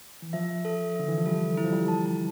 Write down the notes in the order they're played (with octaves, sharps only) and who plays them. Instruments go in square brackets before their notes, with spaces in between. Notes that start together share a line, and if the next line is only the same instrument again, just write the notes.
[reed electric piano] E3
[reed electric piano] F3 [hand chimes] E5
[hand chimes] A4
[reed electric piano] D3 [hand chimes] E5
[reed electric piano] E3
F3
[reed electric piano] G3 [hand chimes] A4
[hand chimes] E4
[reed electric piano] F3
G3
[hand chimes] A5